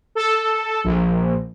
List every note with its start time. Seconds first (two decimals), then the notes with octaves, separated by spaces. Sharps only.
0.15 A4
0.84 A#1